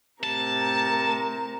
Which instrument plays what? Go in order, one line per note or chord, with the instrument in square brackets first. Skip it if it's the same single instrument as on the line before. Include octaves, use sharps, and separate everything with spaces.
[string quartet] A2 C3 A#4 [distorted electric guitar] A5